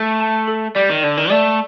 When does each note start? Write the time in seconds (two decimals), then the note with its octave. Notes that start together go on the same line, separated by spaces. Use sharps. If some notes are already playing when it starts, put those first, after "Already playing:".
Already playing: A3
0.20 A5
0.48 A4
0.75 G3 D5
0.90 D#3
1.03 D3 D5
1.17 D#3
1.30 A3 D5